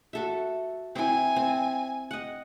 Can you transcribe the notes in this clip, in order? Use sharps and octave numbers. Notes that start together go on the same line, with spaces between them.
F#4 A4 E5
C4 E4 G#5
C4
D#5 F#5